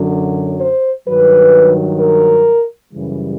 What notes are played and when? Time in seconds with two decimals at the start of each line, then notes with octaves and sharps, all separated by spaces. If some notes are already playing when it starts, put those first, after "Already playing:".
Already playing: F#2 D3 F#3
0.61 C5
1.07 G2 D#3 F#3 B4
2.00 A#4
2.93 F#2 C#3 E3 G3